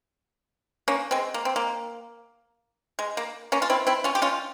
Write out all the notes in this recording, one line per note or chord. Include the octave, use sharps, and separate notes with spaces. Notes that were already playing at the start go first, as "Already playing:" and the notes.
A#3 C#4
G#3 C4
A#3
C4
A#3
G#3
A#3
A#3 C#4
F4
C4 E4
C4 E4
C#4 F4
G4
C#4 F4